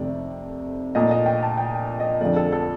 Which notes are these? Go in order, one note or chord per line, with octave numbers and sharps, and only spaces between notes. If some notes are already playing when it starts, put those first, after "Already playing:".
Already playing: F2 C3 D#3 A3 D5
A#2 A3 D#5
D#5
G5
A5
G5
D#5
F2 D3 F3 A3 D5
A4
A4